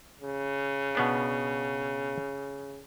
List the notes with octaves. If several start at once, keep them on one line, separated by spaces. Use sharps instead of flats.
C#3
B2 B3 D4